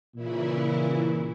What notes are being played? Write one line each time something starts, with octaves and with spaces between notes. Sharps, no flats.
A#2 C#3 E3 E4